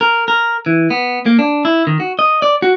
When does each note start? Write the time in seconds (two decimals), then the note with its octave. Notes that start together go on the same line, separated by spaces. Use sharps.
0.01 A#4
0.28 A#4
0.66 E3
0.90 B3
1.26 A#3
1.39 D4
1.65 E4
1.87 D#3
2.00 F#4
2.19 D#5
2.42 D5
2.62 F#4